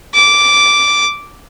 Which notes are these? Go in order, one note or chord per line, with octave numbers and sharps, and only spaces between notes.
D6